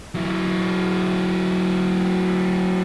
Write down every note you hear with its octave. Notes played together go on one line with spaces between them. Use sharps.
F#3 E4